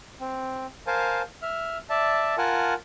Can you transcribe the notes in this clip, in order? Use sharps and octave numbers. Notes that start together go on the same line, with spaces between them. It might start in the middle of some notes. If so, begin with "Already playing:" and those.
C4
A#4 C5 F5 G#5 A5
E5 F6
D5 E5 A5
F4 A#4 F#5 G#5 A5